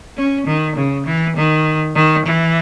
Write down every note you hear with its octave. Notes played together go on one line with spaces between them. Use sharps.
C#4
D#3
C#3
E3
D#3
D#3
E3